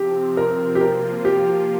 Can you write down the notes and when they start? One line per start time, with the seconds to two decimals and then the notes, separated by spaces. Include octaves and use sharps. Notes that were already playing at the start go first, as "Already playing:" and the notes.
Already playing: C3 F3 C4 G4
0.37 A#4
0.75 G4
0.81 F3 A#3 F4 A#4
1.25 G4